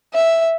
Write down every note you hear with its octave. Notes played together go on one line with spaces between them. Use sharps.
E5